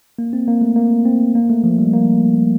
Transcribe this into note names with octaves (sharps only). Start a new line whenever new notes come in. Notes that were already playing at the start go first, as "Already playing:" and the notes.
A#3
C4
A#3
A3
A#3
C4
A#3
A3
F3
G3
A#3